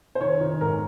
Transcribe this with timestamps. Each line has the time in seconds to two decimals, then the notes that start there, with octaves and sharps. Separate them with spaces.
0.15 C5
0.21 D#3 C#5
0.41 D#3
0.61 G#2 A#4